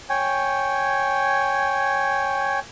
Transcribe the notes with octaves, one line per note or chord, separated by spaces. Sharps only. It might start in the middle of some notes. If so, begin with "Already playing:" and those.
C#5 G5 G#5